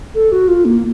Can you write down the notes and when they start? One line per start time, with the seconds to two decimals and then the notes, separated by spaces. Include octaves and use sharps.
0.15 A4
0.32 F#4
0.48 F4
0.65 A#3